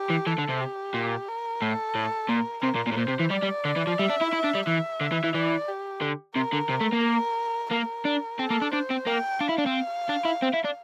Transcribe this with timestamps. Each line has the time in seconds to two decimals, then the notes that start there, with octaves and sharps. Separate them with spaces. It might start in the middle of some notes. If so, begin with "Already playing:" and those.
Already playing: G4
0.10 E3
0.27 E3 A4
0.38 D3
0.49 C3
0.60 G4
0.94 A#2
1.28 A#4
1.62 A2 A4
1.95 A2
2.29 A#2 A#4
2.63 C3 A#4
2.75 A#2
2.87 A#2
2.92 A2
2.97 A#2 C5
3.08 C3
3.20 E3
3.31 G3 D5
3.43 G3
3.65 D3
3.76 E3
3.87 F3
3.99 G3 E5
4.10 D4
4.22 E4
4.33 E4
4.44 D4
4.55 G3
4.67 E3 E5
5.01 D3
5.12 E3
5.24 E3
5.34 E3 D5
5.68 G4
6.01 D3
6.36 C3 A#4
6.53 D3
6.70 C3
6.81 A3
6.93 A#3
7.04 A#4
7.71 A#3 A#4
8.05 D4
8.39 C4 A4
8.50 A#3
8.62 D4
8.73 D4 C5
8.91 C4
9.07 A#3 G5
9.41 D4 F5
9.49 E4
9.58 D4
9.66 C4
10.09 D4
10.25 E4
10.42 C4
10.53 E4
10.64 D4